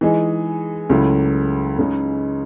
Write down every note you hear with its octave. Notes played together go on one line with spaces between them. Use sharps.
E3 G#3 D#4 G#4
C#2 C#3 F#3 A3 E4
C#2 C#3 G#3 D#4